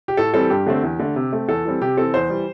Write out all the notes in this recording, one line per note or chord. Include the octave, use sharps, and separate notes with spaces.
G4
A2 A4
E3 G3 C4 A4
G2 G4
D3 A3 C4
E2
D3 A3
C3
A3 C4
E2 A4
E3 G3 C4
C3 G4
E3 C4 A4
E2 C5
E3 G3